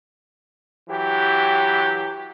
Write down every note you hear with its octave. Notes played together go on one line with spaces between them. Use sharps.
E3 F#3 G4